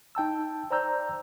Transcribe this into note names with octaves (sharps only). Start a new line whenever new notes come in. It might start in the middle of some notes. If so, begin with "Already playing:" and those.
D#4 G5 A5 E6
C5 D5 A#5 E6 G6